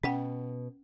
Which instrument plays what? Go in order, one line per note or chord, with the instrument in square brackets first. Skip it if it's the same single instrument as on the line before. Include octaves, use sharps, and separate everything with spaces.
[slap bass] B2 [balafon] C#4 F#5 G5